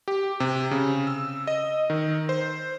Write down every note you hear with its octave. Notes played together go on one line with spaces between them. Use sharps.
G4
C3
C#3
E6
D#5
D#3
C5